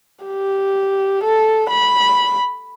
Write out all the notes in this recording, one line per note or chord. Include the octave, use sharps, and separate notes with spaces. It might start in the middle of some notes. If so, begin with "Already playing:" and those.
G4
A4
B5